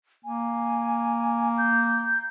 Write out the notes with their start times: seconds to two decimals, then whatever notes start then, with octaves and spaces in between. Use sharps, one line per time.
0.25 A#3 G#5
1.58 G6